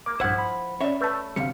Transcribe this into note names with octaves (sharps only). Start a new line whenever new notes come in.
A#3 D6
A#1 G2 F3 E4 C5 F#5
B5
C#4 C#5 D5 E5
A3 B4 A5
D2 C3 G3 F5 C#7